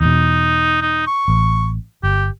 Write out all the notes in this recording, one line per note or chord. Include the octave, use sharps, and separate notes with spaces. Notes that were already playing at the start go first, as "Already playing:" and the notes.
E2 B2 D#4
D#4
C#6
A1
G1 G4